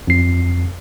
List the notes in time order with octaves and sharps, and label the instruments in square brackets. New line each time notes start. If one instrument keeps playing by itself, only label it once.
[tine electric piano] F2 C7